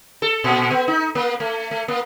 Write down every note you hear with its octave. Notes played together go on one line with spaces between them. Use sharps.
A4
A#2
B3
D#4
A#3
A3
A3
A#3